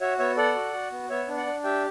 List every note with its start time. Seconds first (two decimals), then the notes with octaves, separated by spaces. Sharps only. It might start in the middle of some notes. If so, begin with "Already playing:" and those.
0.01 F#4 C#5 E5
0.19 B3 C#5 E5
0.37 A4 D5 F#5
0.55 F#4
0.73 F#4
0.92 B3
1.10 B3 C#5 E5
1.28 D4
1.37 D5 F#5
1.46 D4
1.64 G4 E5 G5